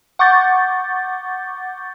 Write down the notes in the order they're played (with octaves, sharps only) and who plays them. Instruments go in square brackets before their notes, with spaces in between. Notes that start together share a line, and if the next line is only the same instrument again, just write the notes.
[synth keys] F#5 C#6 D6 G6 A6